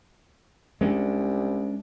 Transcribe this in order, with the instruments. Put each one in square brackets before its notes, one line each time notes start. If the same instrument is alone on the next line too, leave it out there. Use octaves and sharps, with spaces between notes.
[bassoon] C2 [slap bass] G#3 C#4 D4